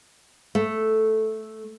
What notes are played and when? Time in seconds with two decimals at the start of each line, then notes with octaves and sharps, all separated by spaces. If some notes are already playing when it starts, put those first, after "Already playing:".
0.55 A3